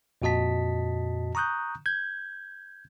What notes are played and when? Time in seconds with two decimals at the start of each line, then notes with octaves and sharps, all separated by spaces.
0.22 F2 A#2 F#4 D#5 A5 B6
1.35 A#5 C#6 D#6 F#6 G6
1.86 G6 G#6